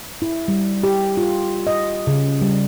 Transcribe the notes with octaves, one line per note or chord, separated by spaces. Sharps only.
E4
G3
G4
F4
D#5
C#3
G3